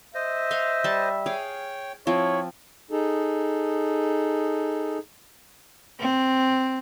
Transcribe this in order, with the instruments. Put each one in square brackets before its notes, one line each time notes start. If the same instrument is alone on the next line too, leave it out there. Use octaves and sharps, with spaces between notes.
[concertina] C5 D#5 [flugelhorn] E5
[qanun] C#5 F5 C6
G3 A5
[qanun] G#4 F5 [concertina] C#5 G5
[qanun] F3 C4 [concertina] E4 [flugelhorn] C#5
[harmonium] D#4 G#4 A4
[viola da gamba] C4